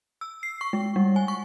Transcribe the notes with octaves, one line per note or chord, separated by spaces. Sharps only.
E6
C7
C#6
G#3
G3
G#5
C#6